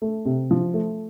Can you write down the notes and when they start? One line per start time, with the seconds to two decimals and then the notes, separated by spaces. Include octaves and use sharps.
0.02 A3
0.25 C3
0.51 F3
0.74 A3